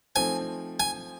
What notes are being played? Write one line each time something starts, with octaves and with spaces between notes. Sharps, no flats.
F3 A3 C4 D#4 G#5
G#5